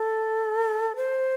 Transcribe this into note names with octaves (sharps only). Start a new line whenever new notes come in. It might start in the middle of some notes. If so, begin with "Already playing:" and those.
Already playing: A4
C5